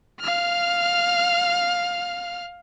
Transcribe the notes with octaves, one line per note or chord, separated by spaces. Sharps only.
F5 F6